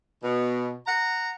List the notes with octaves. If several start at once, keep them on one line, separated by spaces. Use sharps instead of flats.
B2
F#5 A#5